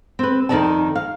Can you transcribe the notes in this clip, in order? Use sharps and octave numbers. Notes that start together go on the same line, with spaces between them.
C4 B4
F2 D#3 D#4 E4 D5 A5
F5